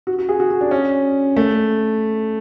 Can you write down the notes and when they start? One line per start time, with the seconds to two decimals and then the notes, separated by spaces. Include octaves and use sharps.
0.07 F#4
0.19 F#4
0.29 G#4
0.40 F#4
0.51 F#4
0.61 D4
0.71 C#4
1.36 A3